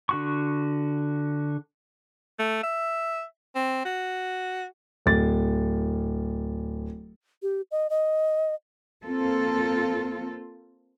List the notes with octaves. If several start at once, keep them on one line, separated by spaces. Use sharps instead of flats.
D3 F#4 C#6
A3
E5
C4
F#4
D1 A6
G4
D#5
D#5
A#3 C4 F4 A4